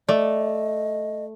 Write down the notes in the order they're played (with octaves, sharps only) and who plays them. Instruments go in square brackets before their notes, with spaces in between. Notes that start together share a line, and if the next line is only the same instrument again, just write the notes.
[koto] A3 [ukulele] D5 [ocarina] D#5